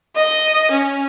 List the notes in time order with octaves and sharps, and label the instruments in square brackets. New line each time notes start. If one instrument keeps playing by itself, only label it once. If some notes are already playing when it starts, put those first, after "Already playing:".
[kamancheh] D#5
C#4